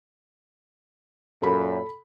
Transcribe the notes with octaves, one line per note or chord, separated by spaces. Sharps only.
F#2 A#2 A4 B5